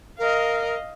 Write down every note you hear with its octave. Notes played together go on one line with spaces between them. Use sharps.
A#4 D#5 F5